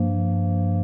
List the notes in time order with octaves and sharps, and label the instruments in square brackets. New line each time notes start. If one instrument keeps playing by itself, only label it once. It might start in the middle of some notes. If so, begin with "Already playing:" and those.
Already playing: [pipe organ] G2 F3 A#3